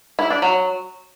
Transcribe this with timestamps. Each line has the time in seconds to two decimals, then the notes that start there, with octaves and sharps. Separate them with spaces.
0.19 E4
0.30 D4
0.42 F#3